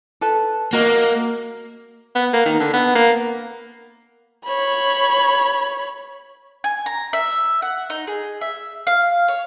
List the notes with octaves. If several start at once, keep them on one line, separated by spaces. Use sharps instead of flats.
A4 B4 A5
A#3 F#4 D#5 A#5
B3
A#3
D#3
D3
B3
A#3
C#5 B5
G#5
A#5
E5
F#5
D#4
G#4
E5
F5
C#5